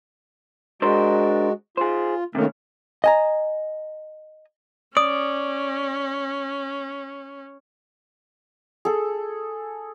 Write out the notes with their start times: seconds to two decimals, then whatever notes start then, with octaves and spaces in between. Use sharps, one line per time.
0.82 G#3 D4 F#4 A#4 C5
1.77 F4 G#4 C5
2.35 C3 D#3 A3 A#3 C#4
3.04 D#5 G#5 A#5
4.97 C#4 D5 D#6
8.85 G#4 A4